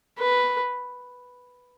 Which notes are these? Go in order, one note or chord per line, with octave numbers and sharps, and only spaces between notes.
B4